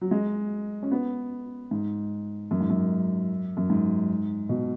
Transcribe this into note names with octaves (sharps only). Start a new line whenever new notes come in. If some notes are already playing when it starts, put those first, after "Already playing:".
F#3
G#3
C#4
B3
G#2
F#2
G#2
F#2
F#2
G#2
B2